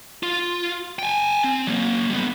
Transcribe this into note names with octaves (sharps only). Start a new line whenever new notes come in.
F4
G5 G#5
C4
F#3 A#3
G3 B3